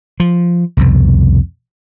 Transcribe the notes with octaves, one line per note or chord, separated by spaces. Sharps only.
F3
C2 F2 B2